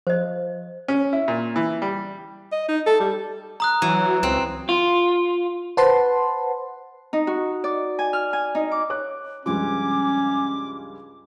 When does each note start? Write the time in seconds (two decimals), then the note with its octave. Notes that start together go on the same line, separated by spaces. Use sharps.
0.07 F3 C5 D#5
0.88 C#4
1.13 E4
1.28 A#2
1.56 E3
1.82 G3
2.52 D#5
2.68 D#4
2.86 A4
3.00 G3
3.60 A#5 D#6 F#6
3.82 E3 F#3
4.23 C#2 C4
4.69 F4
5.77 B4 C5 F#5 A5 C6
7.13 D#4
7.27 F#4
7.64 D5
7.99 G#5
8.13 F6
8.33 G#5
8.55 D#4
8.72 D6
8.90 C#5 D6 F#6
9.46 C#2 G2 F3 C#4 D6